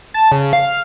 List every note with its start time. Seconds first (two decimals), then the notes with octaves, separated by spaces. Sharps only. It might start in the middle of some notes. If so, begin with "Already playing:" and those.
0.14 A5
0.32 C#3
0.53 F5